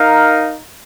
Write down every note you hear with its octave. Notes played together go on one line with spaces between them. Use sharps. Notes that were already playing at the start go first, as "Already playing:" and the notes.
Already playing: D#4 A#4 F5